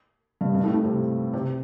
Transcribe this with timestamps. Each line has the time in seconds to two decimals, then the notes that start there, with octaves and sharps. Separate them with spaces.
0.41 G2
0.55 G2
0.64 A2
0.74 A2
0.84 C3
1.33 C3